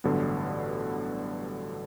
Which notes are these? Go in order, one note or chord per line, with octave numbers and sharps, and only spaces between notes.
A1 G2 D3 F#3 B3